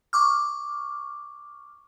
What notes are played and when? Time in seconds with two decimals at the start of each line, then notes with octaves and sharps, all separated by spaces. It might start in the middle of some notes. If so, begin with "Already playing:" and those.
0.13 C#6 D6 F6